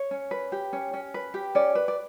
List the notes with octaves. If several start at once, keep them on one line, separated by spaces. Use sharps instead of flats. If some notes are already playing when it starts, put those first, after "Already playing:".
Already playing: C#5
C#4
B4
G4
C#4
C#4
B4
G4
C#4 D5
B4
D5